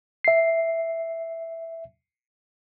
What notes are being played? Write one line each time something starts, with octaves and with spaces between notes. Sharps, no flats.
E5 C7